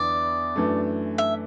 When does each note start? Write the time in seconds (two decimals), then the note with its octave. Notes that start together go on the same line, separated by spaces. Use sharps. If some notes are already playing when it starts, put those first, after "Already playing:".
Already playing: E2 D3 B3 E4 D5
0.56 F#2 E3 A3 D4
1.18 E5